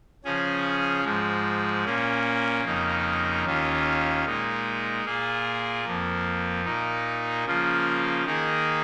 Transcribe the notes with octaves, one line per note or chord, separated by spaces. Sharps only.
C#3 F3 C#4 G#4
G#2 F3 G#3
A#2 A#3 C#4
F2 C#3 A#3 D#4
D#2 D#3 C#4 F4
A#2 G#3 D#4
A#2 A#3 F4 G#4
F2 F3 A#3
A#2 A#3 D#4
C#3 F3 A#3 F4
D#3 A#3 D#4 G#4